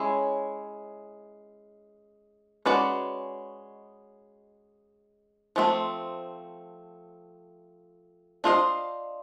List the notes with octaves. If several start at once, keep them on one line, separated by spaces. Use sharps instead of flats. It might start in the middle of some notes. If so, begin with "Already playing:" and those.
Already playing: G#3 C#4 E4 C#5
G#3 C#4 F#4 B4 D5
F3 A3 C4
D4 F4 A4 C5 D#5